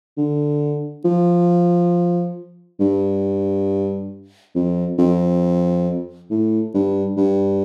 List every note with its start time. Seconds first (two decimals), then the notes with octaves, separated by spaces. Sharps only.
0.17 D3
1.05 F3
2.80 G2
4.55 F2
4.99 F2
6.30 A2
6.74 G2
7.17 G2